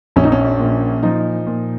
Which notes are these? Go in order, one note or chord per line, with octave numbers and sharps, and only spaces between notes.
A#1 C#4
D#4
C#4
A#2
F3 D#4
A#2